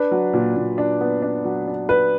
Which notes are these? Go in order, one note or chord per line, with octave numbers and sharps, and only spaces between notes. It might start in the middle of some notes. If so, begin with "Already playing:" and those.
Already playing: D4 B4
F#3
A#2
A#2
D4
B3
D4
F#3
D4
D4 B4